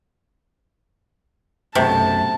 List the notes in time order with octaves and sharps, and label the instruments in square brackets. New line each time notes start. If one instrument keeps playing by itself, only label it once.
[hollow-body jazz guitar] B1 F#2 A3 [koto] C3 [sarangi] A5